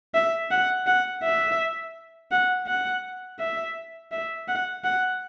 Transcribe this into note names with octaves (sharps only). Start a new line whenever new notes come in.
E5
F#5
F#5
E5
F#5
F#5
E5
E5
F#5
F#5